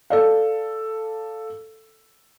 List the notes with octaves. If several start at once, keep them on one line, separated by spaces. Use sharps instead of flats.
A4 D5 F5